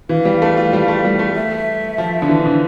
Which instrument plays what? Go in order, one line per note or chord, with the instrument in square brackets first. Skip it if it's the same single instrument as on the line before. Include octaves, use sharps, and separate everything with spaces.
[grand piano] E3 [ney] F5
[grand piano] G3
A3
F4
G3
A3
G3
A3
[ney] E5
[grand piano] F3
D3
E3
D3